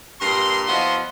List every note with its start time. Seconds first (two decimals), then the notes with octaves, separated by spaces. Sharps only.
0.20 G2 A#2 A#4 C6
0.66 F3 B3 E4 F#4 D#5 C6